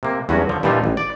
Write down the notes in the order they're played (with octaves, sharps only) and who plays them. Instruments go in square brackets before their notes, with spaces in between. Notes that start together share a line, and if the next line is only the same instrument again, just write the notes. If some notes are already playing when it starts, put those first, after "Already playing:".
[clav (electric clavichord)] C3 A#3
E2 G2 F#3 C#4 F#4
D3 F3
G2 A#2 E3 G3 D#4 F4
A1
D5